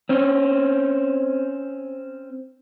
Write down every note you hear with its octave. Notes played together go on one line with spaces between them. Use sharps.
C4 C#4